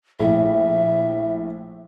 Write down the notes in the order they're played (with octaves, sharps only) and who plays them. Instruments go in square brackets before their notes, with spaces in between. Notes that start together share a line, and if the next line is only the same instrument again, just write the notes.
[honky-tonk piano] A#1 A2 [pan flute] E5